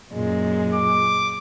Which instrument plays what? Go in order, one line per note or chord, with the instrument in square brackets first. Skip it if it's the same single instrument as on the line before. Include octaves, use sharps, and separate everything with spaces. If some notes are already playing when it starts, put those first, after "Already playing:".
[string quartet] F#2 A#2 G#3
[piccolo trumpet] D6